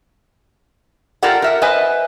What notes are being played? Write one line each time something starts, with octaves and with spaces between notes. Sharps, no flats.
F4 G4 A4 A#4 D5 F#5
A#4 E5 F#5
B4 C5 D#5 E5 G#5